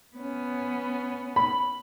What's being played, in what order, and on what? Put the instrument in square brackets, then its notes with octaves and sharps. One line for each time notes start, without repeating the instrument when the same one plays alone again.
[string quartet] B3 C#4
[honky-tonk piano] B5